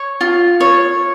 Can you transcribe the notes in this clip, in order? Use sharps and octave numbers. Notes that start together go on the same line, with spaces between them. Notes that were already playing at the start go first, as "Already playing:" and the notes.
Already playing: C#5
F4
C#5